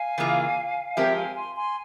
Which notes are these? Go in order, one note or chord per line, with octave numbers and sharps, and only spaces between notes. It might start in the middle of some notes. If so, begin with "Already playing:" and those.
Already playing: F5 G#5
C#3 E3 A#3 F4 G#4
F3 G#3 C4 G4 A#4 E5 G5
F5 G#5
G#5 C6
G#5 C6